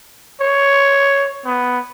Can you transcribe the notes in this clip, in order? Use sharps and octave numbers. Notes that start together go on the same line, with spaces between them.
C#5
B3